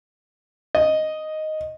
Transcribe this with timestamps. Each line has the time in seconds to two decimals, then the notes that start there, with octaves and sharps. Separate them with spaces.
0.75 D#5